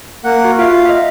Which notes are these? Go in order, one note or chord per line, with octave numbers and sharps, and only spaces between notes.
A#3 F#5
F#4
F4 E5 F5
D#5 E5